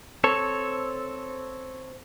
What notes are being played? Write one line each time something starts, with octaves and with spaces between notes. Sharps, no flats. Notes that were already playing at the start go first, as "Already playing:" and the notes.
C4 A4 C#5